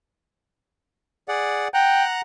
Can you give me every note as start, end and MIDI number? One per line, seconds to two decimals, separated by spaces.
1.28 1.68 68
1.28 1.68 74
1.28 1.68 78
1.74 2.21 78
1.74 2.04 79
1.74 2.21 82
1.74 2.21 90